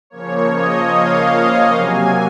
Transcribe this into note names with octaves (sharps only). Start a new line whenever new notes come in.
C#3 F3 A#3 C#5
D#5
F5
C3 F#3 A#3 G#5